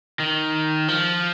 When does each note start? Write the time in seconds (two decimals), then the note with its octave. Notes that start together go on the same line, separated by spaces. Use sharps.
0.20 D#3
0.88 F3